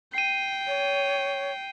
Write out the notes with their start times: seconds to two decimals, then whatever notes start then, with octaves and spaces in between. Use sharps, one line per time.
0.14 G5 C7 D#7
0.67 C#5